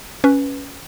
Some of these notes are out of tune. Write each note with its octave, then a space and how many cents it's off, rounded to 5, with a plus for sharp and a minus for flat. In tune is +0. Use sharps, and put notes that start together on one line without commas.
C#4 +5 B4 +0